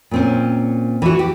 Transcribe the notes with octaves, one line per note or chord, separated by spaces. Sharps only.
A#2 C4 C#4
E3 F#4
G4